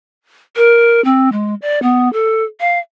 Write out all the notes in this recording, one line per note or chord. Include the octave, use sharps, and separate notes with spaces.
A#4
C4
G#3
D5
B3
A4
F5